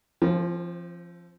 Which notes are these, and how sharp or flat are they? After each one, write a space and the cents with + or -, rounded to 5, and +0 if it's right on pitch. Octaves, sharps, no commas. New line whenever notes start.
F3 -20 C4 +25